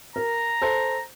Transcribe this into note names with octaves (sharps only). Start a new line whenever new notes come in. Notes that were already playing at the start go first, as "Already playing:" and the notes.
A#4 A#5
A4 C5